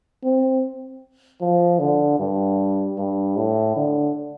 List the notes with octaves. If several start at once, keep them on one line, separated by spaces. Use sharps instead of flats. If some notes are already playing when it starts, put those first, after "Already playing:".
C4
F3
D3
G2
G2
A2
D3